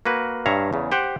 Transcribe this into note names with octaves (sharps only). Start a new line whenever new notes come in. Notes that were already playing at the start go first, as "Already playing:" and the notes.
A#3 F#4 B4
G2 C#5 E5 F5 A#5
E2 C#3
G4 C5 F#5 G5